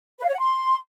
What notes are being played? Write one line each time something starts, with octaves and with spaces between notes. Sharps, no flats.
B4
F5
C#5
F#5
C6